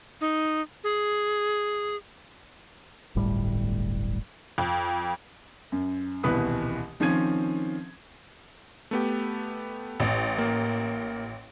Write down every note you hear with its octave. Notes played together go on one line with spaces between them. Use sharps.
D#4
G#4
D1 G1 A2 G3
F2
F#2
D#1 C2 B2 E3 B4 D#6
D#3 F3 C4 C#4 G#6 D#7
A3 B3 G4
A1
A#3